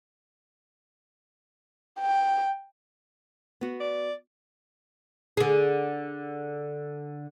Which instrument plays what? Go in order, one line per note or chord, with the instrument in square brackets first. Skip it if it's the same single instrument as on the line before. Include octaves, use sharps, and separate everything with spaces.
[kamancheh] G5
[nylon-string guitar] B3 F#4
[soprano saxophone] D5
[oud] D3 G#4